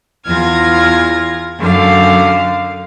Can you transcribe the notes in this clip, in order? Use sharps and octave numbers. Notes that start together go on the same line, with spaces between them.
E2 F4 F6 G#6 A#6
F#2 D3 F5